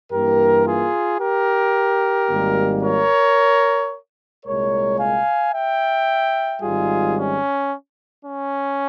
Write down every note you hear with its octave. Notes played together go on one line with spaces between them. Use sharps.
G2 E3 A#3 G4 A#4
F4 G#4
G4 A#4
G#1 G#2 G3 A#3
A#4 C#5
C2 A#2 G#3 A#4 C#5
F5 G#5
E5 G5
G#1 G#2 G3 F4 G#4
C#4
C#4